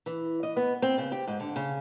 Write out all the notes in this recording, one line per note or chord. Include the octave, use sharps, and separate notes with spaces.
E3
D#5
B3
C4
C#3
G4
G#2
D3
C#3